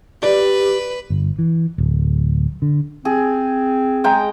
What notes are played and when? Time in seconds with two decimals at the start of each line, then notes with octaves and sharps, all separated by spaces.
0.23 G4 B4 D5
1.10 G1
1.39 E3
1.78 D1
2.62 D3
3.05 C4 G#4
4.04 G#3 G5 A#5